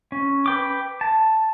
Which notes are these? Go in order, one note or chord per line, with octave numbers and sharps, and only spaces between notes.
C#4
B4 G5 D6
A5